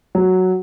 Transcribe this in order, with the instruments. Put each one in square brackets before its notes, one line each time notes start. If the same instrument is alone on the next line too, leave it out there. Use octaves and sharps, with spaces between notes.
[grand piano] F#3